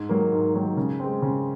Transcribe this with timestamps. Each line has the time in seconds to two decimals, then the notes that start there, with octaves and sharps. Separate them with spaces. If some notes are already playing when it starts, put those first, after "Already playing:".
Already playing: G#2
0.09 D#3 F#3 A#3
0.32 G#2
0.54 D#3 F#3 A#3
0.77 C#3
1.00 G#3 C4
1.22 C#3